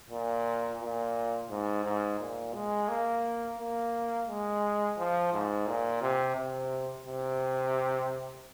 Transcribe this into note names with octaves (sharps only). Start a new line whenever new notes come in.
A#2
A#2
G#2
G#2
A#2
G#3
A#3
A#3
G#3
F3
G#2
A#2
C3
C3
C3